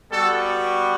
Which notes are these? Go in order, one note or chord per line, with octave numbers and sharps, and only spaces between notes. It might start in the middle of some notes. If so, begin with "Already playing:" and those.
G3 B3 F#4 A4